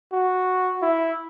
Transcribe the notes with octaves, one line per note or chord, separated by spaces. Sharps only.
F#4
E4